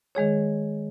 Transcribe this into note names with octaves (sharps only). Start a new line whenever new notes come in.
D#3 G#3 G#4 C#5